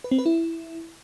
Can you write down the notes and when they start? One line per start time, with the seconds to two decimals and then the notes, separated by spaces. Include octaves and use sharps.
0.04 B4
0.11 C4
0.18 B4
0.26 E4